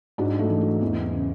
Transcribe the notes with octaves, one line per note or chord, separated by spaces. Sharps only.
G#2 D4 F#4
F#3 A3
E3
F#3
E2 E3
C#3